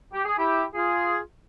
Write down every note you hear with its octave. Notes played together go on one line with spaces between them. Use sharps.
G4
G#4
E4 G4
F4 G#4